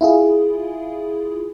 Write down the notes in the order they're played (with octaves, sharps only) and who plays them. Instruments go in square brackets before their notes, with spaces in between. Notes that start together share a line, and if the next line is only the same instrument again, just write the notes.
[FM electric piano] E4 F4 G#4